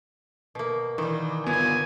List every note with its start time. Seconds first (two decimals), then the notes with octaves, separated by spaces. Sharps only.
0.55 B2 A#3
0.98 D#3 E3 G3
1.46 G1 B3 F4 G#5